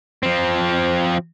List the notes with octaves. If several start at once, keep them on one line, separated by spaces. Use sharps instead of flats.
F3 C4